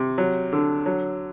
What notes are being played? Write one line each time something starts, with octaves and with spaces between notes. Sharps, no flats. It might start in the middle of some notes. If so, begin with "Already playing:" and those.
Already playing: C3
F#3
D3
F#3